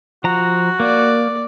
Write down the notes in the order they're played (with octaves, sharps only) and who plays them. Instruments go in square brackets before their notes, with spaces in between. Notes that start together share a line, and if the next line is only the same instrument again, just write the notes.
[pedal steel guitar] F3 A#5 [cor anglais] F#4
[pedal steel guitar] A#3 [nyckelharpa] D5